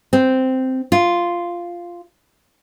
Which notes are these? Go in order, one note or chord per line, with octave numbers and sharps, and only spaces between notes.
C4
F4